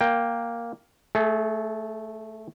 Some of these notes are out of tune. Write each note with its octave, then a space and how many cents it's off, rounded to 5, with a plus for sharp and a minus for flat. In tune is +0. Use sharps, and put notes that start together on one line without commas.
A#3 +0 G5 +5
A3 -5 G#4 +35